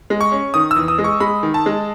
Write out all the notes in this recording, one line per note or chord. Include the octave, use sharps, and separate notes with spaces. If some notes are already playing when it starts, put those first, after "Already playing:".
G#3
C#6
C#4
D#3 D#6
E6
E2
D#6
G#3
C#6
G#3 B5
D#3
A5
G#3